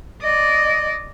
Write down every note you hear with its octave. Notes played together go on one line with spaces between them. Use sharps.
D5 D#5